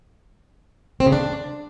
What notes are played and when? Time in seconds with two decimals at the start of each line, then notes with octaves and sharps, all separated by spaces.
1.00 C4
1.06 C#3
1.12 D4